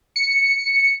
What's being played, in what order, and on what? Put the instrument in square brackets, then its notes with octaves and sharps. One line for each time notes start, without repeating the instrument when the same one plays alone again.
[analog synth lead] C#7